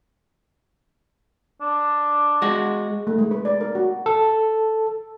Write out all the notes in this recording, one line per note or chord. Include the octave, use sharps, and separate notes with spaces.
D4
G#3 F#4
A3
G#3
B4
D5
A#4
F#4
A4